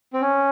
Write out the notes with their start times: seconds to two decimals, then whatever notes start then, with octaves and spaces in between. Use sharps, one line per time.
0.14 C4
0.21 C#4